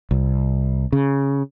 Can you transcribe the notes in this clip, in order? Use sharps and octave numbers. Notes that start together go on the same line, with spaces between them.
C2
C#3